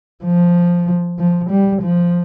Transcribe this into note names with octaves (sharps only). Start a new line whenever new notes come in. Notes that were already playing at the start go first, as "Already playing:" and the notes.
F3
F3
G3
F3